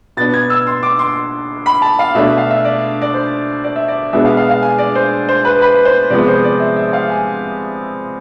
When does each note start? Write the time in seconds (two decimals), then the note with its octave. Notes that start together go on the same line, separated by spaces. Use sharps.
0.17 B2 B3 D4 A6
0.34 G#6
0.50 E6
0.67 C6
0.83 D6
0.99 C6
1.66 B5
1.82 A5
1.99 F5
2.15 B2 A3 D4 E5
2.37 F5
2.51 E5
2.65 D5
3.02 D5
3.14 C5
3.64 D5
3.76 E5
3.88 D5
4.13 B2 G#3 B3 D4 E5
4.25 F5
4.37 F5
4.49 F5
4.62 G#5
4.78 D5
4.95 C5
5.29 C5
5.45 B4
5.62 B4
5.85 C5
6.10 C3 F3 G#3 B3 D5
6.28 C5
6.44 D5
6.60 E5
6.76 E5
6.93 F5
7.10 G#5